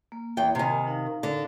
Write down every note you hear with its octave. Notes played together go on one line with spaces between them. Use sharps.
A#3
E2 G5
C3 D#3 A#4 G#5 B5
D#4 A#4 F5
D3